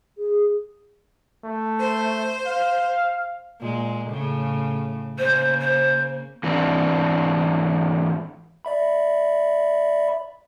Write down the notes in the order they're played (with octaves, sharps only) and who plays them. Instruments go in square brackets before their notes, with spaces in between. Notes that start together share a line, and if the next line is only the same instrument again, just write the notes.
[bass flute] G#4
[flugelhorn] A3
[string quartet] C5
[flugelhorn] F5
[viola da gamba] A#2 G#3
A2 C#3
[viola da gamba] C#3 A#3 [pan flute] C5
[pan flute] C5
[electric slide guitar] G#2 E3 C4 D4
[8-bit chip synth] D5 E5 B5